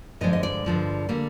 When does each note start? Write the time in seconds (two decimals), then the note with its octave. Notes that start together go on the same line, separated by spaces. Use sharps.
0.21 G2 D3 F3 G#3 D#5
0.33 D#5
0.43 D5
0.65 G2 D3 F3 G#3
1.09 D3 G3 A#3